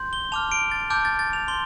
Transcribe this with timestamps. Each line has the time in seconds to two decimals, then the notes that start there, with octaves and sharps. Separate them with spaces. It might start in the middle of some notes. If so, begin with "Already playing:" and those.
Already playing: C6 G6
0.13 G7
0.32 A5 D6 F6 F7
0.52 D7
0.71 A6
0.90 A5 D6 F6 G6
1.05 A6
1.19 A6
1.33 F7
1.48 C6 G7